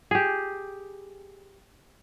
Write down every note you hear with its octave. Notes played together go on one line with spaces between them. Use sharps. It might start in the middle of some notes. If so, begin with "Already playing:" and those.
G4 G#4